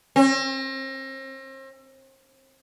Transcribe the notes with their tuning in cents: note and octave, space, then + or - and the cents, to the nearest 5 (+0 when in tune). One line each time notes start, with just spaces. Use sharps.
C4 +40